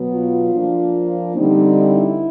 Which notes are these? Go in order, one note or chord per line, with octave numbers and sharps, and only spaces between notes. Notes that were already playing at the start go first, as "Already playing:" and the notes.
Already playing: B2 F#3 B3
F4
F3 A#3 D4
D3 G3 C4 D#4
E4